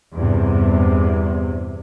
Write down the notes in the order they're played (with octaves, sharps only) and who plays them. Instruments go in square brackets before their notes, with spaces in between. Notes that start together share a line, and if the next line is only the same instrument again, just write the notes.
[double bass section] E2 G2 C3